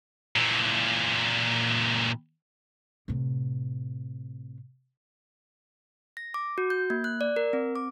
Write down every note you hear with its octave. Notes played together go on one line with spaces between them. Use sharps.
A#2 E3
A2 C3
A#6
D6
F#4
G6
A#3
F#6
D5
A#4
C4
D6